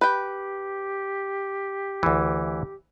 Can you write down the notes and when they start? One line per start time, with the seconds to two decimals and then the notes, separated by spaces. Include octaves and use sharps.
0.01 G4 B4 G5
2.03 D2 E3